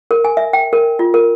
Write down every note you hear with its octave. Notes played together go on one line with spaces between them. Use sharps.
A#4
G#5
E5
G5
A#4
F4
A#4